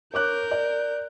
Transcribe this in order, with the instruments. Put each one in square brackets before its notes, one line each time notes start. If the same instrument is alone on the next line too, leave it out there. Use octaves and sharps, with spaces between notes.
[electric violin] A#4 G6 [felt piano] C#5 D6 F#6
[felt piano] D5